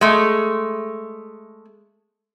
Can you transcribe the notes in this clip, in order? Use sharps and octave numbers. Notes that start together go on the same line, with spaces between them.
G#3 A3